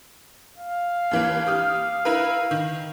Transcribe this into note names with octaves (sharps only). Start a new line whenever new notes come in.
F5
D#2 E3 A#3
G4 D#6 F6
E4 A#4 B4
D#3